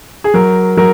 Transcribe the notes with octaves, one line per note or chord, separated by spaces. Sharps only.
G#4
F#3 A#4
F#3 A#4